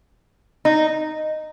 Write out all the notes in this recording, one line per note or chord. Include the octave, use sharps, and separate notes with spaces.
D#4